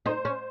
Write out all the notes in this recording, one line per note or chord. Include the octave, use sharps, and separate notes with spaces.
D#4 C5
C#4